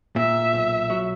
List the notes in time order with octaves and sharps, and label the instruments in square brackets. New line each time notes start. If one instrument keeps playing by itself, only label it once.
[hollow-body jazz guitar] A#2 [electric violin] E5
[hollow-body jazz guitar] B1
F#3